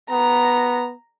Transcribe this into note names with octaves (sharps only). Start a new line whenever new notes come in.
B3 A#5